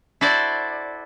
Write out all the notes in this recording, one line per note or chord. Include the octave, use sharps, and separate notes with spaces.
E4 F#4 A4 C5 D5